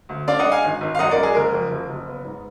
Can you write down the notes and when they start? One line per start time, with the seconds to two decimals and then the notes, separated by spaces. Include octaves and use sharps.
0.09 D2
0.28 D4 D5 F5
0.39 D#5 F#5
0.46 G#3
0.52 F5 G#5
0.64 G#1
0.81 G#1
0.95 F5
0.99 F#2 D#5 F#5
1.11 A#4 D5
1.17 G#3
1.23 G#4
1.35 F#1 A#4
1.53 F2
1.71 F#1
1.89 F#1
2.08 B3
2.25 G#2